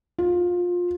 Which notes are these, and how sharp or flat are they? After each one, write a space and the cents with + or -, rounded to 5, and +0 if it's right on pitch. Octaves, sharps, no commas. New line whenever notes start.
F4 +20